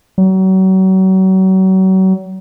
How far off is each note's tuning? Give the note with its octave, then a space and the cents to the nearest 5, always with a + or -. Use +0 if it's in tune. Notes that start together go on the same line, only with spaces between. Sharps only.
F#3 +35